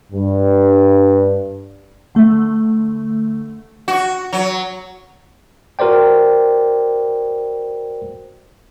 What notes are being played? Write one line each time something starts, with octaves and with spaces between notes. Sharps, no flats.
G2
D3 A3
F#4
F#3
F#4 A#4 C5 D5 G5